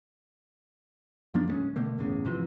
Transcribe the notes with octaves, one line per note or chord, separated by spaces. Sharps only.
F2 F3 A#3 D4
D1 G3 G#3 C#4
B2 D3 A3 A#3
G1 E2 A2 C#3
G#2 C3 E3 F3